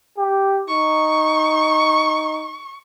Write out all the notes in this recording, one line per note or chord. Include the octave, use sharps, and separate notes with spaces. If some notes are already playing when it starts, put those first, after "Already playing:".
G4
D#4 C#6